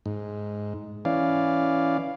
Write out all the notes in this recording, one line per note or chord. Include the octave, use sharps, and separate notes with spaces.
G#2
E3 C#4 D5 F5